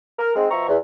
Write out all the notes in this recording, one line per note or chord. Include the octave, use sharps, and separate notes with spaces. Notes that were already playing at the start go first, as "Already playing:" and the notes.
A#4
G#2 G#3 C4
B2 F3 E5 A#5 C#6
E2